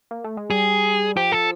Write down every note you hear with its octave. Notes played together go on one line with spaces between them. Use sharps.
A#3
A3
G#3
G3 G#4
F3 G4
A4